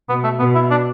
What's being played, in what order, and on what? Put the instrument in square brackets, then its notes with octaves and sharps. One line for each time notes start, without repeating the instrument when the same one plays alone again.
[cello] B2 [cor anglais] B3
[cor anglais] A3
[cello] B2 [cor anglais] B3
[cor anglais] E4
D4